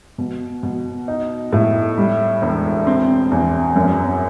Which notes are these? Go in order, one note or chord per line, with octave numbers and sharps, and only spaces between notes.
B2
B2
D#4
A2
G3
E1
C4
E2
F#2